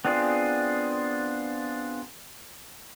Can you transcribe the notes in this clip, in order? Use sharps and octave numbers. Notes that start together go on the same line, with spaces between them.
B3 C4 D4 F4 G#4